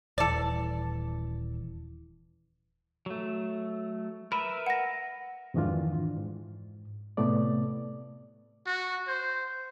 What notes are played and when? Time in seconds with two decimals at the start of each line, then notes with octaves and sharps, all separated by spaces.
0.18 D#1 E3 A4 D5
3.06 F#3 A3
4.32 A#4 B4 E5 B5
4.66 F#5 A#6
5.54 F2 G#2 D#3 E3 D4 F4
6.17 G#2
7.17 A2 C3 A3 B3 D5
8.67 F#4
9.08 C5